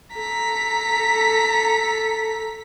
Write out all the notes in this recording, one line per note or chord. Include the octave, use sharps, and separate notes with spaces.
A4 A#5 B6